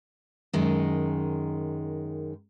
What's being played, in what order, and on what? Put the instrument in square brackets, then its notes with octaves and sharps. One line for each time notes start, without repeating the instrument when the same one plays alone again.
[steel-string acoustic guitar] F#2 D#3 G#3